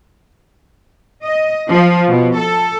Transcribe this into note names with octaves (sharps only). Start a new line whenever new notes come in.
D#5
F3
B2
A4